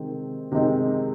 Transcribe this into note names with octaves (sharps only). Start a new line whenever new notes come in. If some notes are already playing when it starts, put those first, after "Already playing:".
Already playing: C3 D#3 G#3 C4 D#4
C3 D#3 G#3 C4 D#4